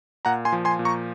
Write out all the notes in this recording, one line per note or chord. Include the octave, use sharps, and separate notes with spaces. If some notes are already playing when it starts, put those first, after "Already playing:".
A#2 F#5 A#5
G#5 C6
F3
G#5 C6
A#2
A#5 C#6